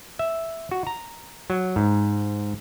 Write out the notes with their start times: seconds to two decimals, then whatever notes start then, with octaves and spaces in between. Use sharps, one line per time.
0.19 E5
0.71 F#4
0.87 A#5
1.50 F#3
1.76 G#2